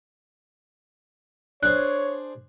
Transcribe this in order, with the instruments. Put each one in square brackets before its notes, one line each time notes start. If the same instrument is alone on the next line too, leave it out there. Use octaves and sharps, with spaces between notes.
[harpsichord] D4 G#4 C5 [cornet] C#5 [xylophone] F#6